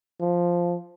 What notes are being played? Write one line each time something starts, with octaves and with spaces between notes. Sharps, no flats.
F3